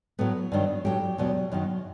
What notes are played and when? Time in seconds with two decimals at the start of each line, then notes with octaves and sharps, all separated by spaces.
0.19 A2 F#3 B3
0.52 G2 D#3 F#3
0.85 A2 F#3 G4
1.18 E2 B2 F#3
1.52 F#2 D#3 F#3